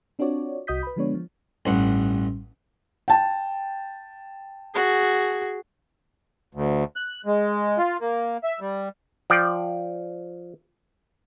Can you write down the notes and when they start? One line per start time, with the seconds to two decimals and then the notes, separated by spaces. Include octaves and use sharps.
0.19 C4 D4 F4 F#4 C#5 D5
0.67 C2 F#4 D#5 D#6 G6 B6
0.83 B4 B5
0.96 D3 F3 G#3 B3 D4 C#5
1.15 F3
1.66 A1 G2 F#5
3.08 G5 A5
4.75 F#4 G#4
6.55 D2
6.96 F#6
7.26 G#3
7.78 F4
8.01 A#3
8.44 E5
8.60 G3
9.30 F3 D5 G5